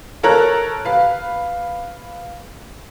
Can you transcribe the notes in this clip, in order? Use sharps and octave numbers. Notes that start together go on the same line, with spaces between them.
A4 A#4 C#5 A#5 F#6
B4 F5